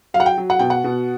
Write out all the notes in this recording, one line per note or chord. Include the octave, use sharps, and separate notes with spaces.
F#3 F5
F#5
G5
F#3
F#5
B2 G5
F#5
B2